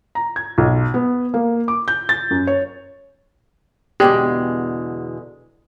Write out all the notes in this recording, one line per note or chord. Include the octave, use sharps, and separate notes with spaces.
A#5
G#6
B1
B3
A#3
D6
G6
A6
F#2
C#5
E2 B2 D3 G#3 G4